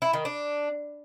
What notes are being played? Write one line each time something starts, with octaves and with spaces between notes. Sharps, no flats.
E4
D#3
D4